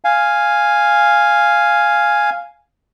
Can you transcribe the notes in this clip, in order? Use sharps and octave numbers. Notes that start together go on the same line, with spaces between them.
F5 G#5